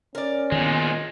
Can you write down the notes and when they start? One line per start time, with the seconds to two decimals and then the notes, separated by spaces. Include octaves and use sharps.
0.15 C#4 A#4 D5
0.52 A#2 D#3 G#3 B3